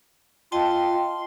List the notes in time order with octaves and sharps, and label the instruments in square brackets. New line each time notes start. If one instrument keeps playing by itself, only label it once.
[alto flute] F4 [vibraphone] D#5 G5 A5 [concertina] C6